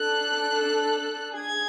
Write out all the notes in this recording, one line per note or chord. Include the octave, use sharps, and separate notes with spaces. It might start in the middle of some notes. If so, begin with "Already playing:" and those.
Already playing: D4 A4 F#6
G#4 G#6